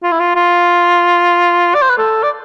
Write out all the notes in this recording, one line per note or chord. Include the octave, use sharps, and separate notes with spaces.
F4
E4
F4
F4
D5
C5
B4
A4
D5